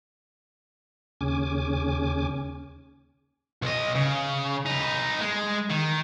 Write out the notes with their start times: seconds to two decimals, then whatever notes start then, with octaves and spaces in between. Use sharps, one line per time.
1.21 D#2 C#3 C#4 G#5 D6
3.62 B1 D#5
3.96 C#3
4.66 D#4 B4
5.21 G#3
5.70 D#3